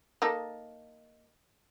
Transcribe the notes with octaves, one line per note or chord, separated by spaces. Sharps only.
A#3 D#4 A4